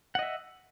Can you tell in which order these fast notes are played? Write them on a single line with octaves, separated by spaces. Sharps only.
F#5 D#5 E5